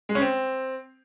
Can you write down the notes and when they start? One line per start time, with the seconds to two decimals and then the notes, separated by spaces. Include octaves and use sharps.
0.09 G#3
0.15 C#4
0.21 C4